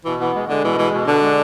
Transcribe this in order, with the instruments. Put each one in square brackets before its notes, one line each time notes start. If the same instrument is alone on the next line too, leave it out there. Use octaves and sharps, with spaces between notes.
[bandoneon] B2 [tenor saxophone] E3
[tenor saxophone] E3 [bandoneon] B3
[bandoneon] G#3
[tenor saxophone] D3 [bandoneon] G#3
[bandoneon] B2 [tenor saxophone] E3
[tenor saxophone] E3 [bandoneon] G#3
[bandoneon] B2
[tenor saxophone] D3 [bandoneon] D4
[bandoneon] G#3